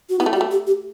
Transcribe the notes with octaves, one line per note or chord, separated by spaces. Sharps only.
F#4
B3 E4
A3
G3 F#4
A3
G4
G4